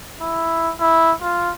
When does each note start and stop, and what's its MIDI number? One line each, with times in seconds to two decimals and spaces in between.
0.21 0.72 64
0.80 1.13 64
1.21 1.52 65